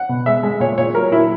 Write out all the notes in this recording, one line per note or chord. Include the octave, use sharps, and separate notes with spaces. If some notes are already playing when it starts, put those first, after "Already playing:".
Already playing: F#5
B2
G#3 E5
G#3
A#2 C#5
A#2 C#5
F#3 A#4
F#3 E4